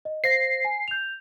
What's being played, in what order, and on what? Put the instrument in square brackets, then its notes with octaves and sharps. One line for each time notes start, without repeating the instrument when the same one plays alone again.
[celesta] D#5
[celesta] C5 F5 A#6 [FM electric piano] C7
[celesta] G#5
G6 F7